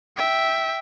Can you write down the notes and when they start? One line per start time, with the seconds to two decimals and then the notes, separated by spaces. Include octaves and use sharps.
0.17 E5 G5